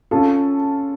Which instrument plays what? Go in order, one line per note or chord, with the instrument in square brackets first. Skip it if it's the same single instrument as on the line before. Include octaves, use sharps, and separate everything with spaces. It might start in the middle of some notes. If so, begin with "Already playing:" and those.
[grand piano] C#4 [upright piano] F4 A4